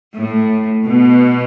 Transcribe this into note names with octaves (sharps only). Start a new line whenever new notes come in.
A2
B2